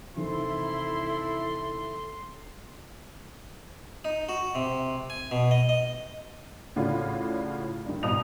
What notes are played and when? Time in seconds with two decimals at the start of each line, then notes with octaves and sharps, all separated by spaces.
0.16 C3 D#3 E3 E4 A4 C6
4.05 D#4
4.29 F#4
4.55 C3
5.10 G#5
5.31 B2
5.51 D#5
5.69 D#5
6.76 A2 C#3 D4 F4 F#4
7.86 G2 D#3
8.03 C2 B2 D#5 D#6 F7